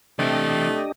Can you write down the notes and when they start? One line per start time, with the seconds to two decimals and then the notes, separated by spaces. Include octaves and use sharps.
0.19 C3 E3 A3 D4 G4 D#5 G5